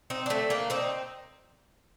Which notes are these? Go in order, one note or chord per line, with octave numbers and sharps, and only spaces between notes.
C4 D#4
D4
A3 C4
A#3 D4
C4 D#4